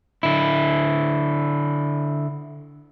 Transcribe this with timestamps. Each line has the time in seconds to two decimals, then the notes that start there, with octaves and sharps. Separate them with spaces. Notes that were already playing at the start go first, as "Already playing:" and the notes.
0.23 D3 E4